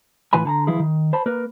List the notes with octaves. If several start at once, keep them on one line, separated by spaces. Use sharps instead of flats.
A2 E3 F4 B4 G#5 B5
D3 A5 A#5
E3 F3 E4 G#4
D#3
C5 A5 B5
A#3 A#4 B4